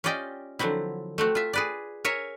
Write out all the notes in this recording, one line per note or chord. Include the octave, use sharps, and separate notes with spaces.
C#4 F4 G4 D5 D#5 G5
D3 F3 F#3 C4 E4
A3 C4 F#4
F4 E5
G#4 B4 D5
A#4 C#5 E5 G#5